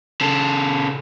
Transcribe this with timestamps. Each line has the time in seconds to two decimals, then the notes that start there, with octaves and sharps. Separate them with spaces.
0.21 C#3 A4